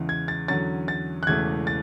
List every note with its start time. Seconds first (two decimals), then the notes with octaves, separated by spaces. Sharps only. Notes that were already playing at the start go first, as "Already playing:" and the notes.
Already playing: E2 C#3 E3 G#3
0.09 G#6
0.28 A6
0.48 E2 D3 F#3 C#4 A6
0.88 A6
1.23 F#6
1.27 E1 E2 C#3 E3 A3 G#6
1.67 A6